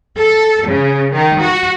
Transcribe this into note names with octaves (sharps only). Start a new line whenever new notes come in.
A4
C#3
D#3
F#4